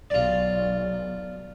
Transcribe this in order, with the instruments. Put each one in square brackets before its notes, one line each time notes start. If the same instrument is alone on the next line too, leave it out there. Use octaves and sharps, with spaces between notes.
[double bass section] B1 [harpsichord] F4 D5